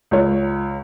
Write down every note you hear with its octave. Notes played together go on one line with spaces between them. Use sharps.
C#2 C#5